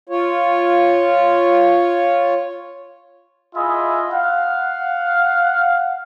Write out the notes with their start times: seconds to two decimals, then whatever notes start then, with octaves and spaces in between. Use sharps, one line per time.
0.09 F4 C#5
3.54 E4 F4 G#4 D#5 E5
4.10 F5 F#5